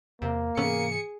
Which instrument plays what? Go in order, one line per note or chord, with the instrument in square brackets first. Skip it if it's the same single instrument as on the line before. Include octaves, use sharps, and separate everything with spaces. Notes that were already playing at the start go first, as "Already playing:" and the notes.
[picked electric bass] E2 [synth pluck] C3 [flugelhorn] A#3
[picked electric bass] G#2 C3 E3 [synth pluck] B3 C#4 A4 [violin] G#4 C#7